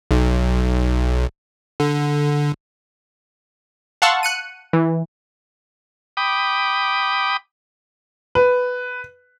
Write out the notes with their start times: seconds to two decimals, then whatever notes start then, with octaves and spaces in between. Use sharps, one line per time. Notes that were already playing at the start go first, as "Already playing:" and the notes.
0.11 B1
1.80 D3
4.02 F5 F#5 A5 C6 C#6 E6
4.23 F#6 C#7 D#7
4.73 E3
6.17 G5 B5 D6 D#6
8.35 B4